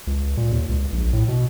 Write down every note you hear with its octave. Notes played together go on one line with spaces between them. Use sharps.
C#2
A#2
D#2
C#2
A#1
A2
B2